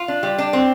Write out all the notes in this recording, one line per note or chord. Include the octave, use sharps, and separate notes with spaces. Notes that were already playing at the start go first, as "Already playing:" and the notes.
Already playing: F4
D4
G3
D4
C4